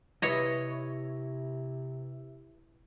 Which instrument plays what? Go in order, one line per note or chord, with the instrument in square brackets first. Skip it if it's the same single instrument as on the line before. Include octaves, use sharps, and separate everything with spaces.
[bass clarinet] C3 [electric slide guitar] E4 B4 [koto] C#5 D#5